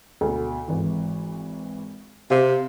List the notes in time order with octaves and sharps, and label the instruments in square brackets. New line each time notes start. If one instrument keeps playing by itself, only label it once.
[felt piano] D2 B2
G#1 E3
[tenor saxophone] C3 [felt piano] F5